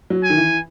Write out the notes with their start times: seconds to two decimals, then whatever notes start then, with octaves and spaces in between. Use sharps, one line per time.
0.10 F#3
0.24 G#5
0.30 D#3
0.37 E3